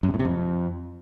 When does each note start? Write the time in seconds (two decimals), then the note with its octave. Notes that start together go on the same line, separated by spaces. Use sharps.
0.03 F#2
0.09 C3
0.14 A2
0.19 C3
0.25 F2